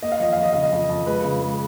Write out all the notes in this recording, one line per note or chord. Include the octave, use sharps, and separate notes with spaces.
A#3 D#5
F5
F3 D#5
F2 F5
D#5
C#3 F5
D#5
F2
F2
G#3 B4
C#3
G#3